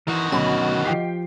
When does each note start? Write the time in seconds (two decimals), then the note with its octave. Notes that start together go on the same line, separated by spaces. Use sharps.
0.08 D#3 E3 F#4 C6 C#6
0.32 D2 B2 F#3 C#4 D#5 F#5 B5
0.85 F3 G4 G5 C7